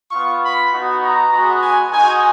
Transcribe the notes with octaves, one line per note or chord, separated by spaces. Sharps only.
B3 F4 C#6
B5
B3 D#4 F#4
A#5
G#3 B3 F#4
G#5
G#3 D#4 F#4 G#5